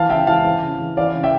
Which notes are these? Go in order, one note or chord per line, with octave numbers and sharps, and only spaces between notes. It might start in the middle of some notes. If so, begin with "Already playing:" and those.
Already playing: E3 F5 A5
C#3 E5 G5
E3 F5 A5
E3
C#3
E3
E3 D5 F5
C#3
E5 G5